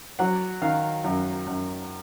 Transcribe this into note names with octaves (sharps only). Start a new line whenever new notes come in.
F#3 F#5
D#3 F5
F#2
F#2